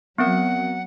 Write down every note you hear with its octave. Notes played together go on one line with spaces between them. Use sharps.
F#3 B3 C4 A#4 F#5